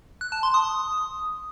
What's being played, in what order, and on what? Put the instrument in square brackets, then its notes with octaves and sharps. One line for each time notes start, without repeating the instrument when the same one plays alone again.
[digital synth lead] F#6
A5
C6
D#6